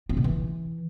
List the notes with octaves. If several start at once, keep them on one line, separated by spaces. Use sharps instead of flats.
C4
B2
E3